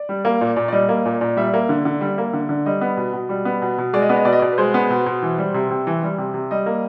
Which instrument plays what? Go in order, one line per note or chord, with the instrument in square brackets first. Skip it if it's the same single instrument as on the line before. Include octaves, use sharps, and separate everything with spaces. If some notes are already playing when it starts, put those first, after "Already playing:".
Already playing: [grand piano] D5
G3
A#3
A#2
A#2
D5
G3 D#5
A#3
A#2
A#2
G3 E5
A#3
D3
D3
G3
A#3
D3
D3
G3 D#5
B3
B2
B2
G3
B3
B2
B2
G#3 D5
D#5
B3 D5
D#5
B2 D5
D#5
B2 D5
B4
G#3 C5
B3
B2
B2
E3
G3
C3
C3
E3
G3
C3
C3
G3 D#5
A#3